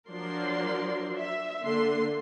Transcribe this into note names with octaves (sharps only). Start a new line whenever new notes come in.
F3 F#3 D4 A#4 D5 C6
E5
D3 A#3 C6